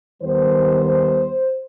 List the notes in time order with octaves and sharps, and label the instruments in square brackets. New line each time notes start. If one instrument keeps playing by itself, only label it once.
[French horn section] D#2 D#3 G3 B3 C5